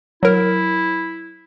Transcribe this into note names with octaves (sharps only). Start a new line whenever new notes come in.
F#3 E4 A#4